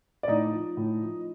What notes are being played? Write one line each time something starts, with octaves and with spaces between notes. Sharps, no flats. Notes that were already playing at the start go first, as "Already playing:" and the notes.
D5
A2 D#4 D#5
F3
A2
F3